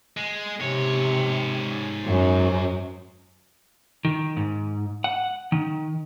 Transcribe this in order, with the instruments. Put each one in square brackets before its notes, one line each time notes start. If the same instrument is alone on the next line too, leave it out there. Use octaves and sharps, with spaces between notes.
[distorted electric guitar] G#3
[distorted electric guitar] G#2 C#5 [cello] C3
[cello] F#2
[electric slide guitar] D#3
G#2
F#5
D#3